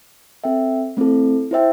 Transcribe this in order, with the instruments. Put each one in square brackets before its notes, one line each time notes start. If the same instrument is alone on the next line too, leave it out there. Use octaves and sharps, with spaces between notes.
[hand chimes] C4 A4 E5 G5
A3 C4 E4 A4
E4 C5 E5 G5